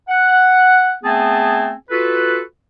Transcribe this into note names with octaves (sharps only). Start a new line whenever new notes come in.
F#5
A3 B3 C4 G#4 G#5 A5
F4 F#4 A4 B4